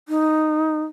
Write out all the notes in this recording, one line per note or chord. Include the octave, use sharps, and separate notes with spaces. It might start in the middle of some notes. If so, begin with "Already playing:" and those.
D#4